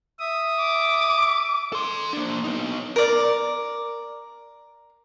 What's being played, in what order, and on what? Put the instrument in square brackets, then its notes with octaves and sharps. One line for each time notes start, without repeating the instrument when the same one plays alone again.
[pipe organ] E5 D#6
[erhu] D6
[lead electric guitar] A4 C6
A#3 D4
B3 D#4
[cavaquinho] A#4 D5